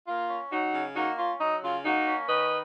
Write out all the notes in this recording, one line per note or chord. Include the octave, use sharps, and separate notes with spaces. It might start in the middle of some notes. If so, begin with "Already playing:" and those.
A#3 F4
C#4
F#3 D#4 F#4
C#3
A#3 D#4 F#4
C#4 F4
F#3 D#4
C#3 F4
A#3 D#4 F#4
C#4
D#3 B4 D#5